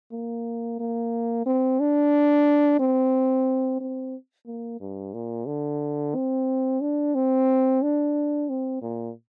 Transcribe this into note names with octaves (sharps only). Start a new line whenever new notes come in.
A#3
A#3
C4
D4
C4
C4
A#3
G2
A#2
D3
C4
D4
C4
D4
C4
A#2